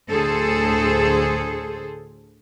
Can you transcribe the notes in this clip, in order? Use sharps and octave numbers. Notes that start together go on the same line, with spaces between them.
D2 A2 G#4 A4 C5